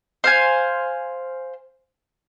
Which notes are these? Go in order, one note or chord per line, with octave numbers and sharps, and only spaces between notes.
C5 F5 G#5